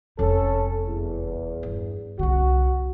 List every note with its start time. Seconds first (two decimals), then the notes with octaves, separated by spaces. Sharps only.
0.19 F1 G3 C#4 A4
0.85 E2
1.63 G2
2.19 C2 D3 F#4